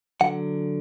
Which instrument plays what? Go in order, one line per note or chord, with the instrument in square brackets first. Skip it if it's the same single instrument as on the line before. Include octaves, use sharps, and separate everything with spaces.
[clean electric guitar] D3 F#3 F#5